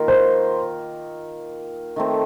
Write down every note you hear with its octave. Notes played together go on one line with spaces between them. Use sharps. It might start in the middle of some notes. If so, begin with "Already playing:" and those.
Already playing: D#3 A#3 F4 A#4
C5
D#3 A3 C4